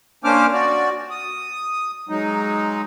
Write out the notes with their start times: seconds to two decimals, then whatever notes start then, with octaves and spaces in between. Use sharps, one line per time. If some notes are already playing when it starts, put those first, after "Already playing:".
0.24 A#3 C#4 D4 C5 D6 F6
0.53 F#4 D5
1.11 D#6
2.09 F#3 G#3 D#4